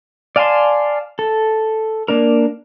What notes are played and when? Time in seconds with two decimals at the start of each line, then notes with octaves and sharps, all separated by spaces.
0.36 D5 F5 G#5 A5 C6
1.19 A4
2.08 A#3 D4 A#4